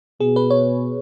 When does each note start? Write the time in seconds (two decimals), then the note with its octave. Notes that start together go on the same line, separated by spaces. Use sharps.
0.20 B2 G#4
0.36 B4
0.50 C#5